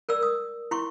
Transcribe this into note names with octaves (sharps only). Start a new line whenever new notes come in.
A#4 D5 E6
D#6
E4 C6 C#6